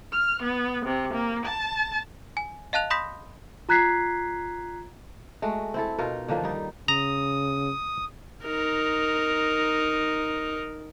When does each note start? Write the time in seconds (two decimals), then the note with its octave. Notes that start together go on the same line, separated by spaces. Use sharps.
0.13 F6
0.43 B3
0.85 C3
1.14 A#3
1.46 A5
2.37 G#5
2.73 D#5 F5 A5 F#6 F7
2.90 B5 C6 D#6 G6 A#6 B6
3.69 F4 A#5 F#6 G#6 B6 C7
5.42 G#3 A3 F#4
5.74 C4 E4 A4
5.98 B2 D#4 F4 A#4
6.28 D3 D#3 F3 A#3
6.44 G3 D#4
6.88 C#3 A#5 D#6
8.45 D#4 A#4